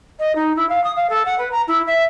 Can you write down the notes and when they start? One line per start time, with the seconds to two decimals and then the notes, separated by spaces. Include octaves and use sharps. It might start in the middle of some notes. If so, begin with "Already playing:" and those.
0.19 D#5
0.35 D#4
0.56 E4
0.69 F5
0.84 D#6
0.96 F5
1.09 A4
1.25 F#5
1.38 B4
1.51 A#5
1.67 E4
1.86 E5